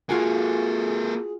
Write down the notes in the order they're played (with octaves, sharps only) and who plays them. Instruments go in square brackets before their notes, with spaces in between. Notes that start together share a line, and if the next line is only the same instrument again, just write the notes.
[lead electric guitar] A#3 A4 [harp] F4 F#4 G#5 [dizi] G#4